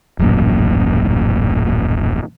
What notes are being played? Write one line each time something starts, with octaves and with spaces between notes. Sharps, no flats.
D#1 A1 F#2 A#2